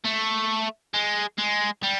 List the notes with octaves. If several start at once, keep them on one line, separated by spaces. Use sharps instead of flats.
A3
G#3
G#3
G3